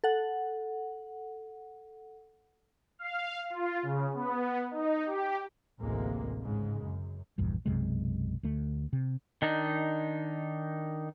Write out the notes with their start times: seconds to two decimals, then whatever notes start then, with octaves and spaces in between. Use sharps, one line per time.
0.04 A4 F#5
2.99 F5
3.50 F4
3.83 C#3
4.14 B3
4.71 D#4
5.06 G4
5.80 A1 D2 A2 C3 G#3 A#3
6.41 G#2 C#3 G#3
6.81 F#2
7.38 A#1 E2 G2
7.66 B1 F#2 C3 G#3
8.43 D2 A3
8.93 C3
9.42 D#3 D4 D#4